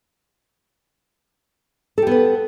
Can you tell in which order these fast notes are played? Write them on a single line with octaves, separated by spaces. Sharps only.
A4 G4 B3 B4